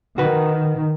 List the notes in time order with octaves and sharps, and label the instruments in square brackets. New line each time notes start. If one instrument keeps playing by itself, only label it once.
[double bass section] D#3 [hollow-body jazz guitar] F#4 B4